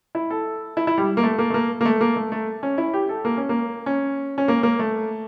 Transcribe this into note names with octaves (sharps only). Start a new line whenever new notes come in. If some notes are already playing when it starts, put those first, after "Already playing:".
E4
A4
E4
E4
G3
A#3
A3
A#3
A3
A#3
A#3
A3
A#3
A3
A3
C#4
E4
G4
A4
A#3
C#4
A#3
C#4
C#4
A#3
A#3
A3